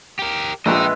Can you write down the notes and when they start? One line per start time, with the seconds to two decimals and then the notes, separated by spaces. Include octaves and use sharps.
0.19 G4 A#4
0.66 A#1 G#3 B4 D#5 E5 G5